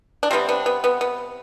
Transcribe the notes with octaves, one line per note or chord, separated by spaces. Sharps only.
D4
C3 G3 B3 C4
B3 D4
B3
B3
B3